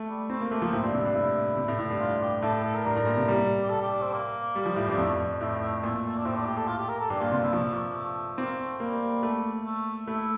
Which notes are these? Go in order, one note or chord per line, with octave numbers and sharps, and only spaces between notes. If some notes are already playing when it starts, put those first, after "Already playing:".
Already playing: A3
G3
A3 C4
A#3
A3 A#3
F3
A#3
A2 C4
G2
C3 E4
G2
A2 E4
C3
A2
A2
G2
F4
G4
A2 A4
A4
A4
A#4
G2 A#4
A2
A#2
C3
G3
G4
A4
G4
D4
C4
A#3
G3
F3
A2
G2 A#3
F2 A3
A2 A3
A3
A#2 A3
A3
D4
A2 C4
D4
G4
A4
F4
G4
A#4
A4
G2 G4
A#2 F4
C3 F4
E4
F3 A3
A3
A#3
A#3
A3
A#3 C4
A3
G3 A#3
A3
A3
A3 E4